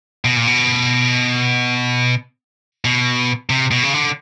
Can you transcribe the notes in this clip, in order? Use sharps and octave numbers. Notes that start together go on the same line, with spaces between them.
B2
A#2
B2
B2
C3
B2
C#3
D3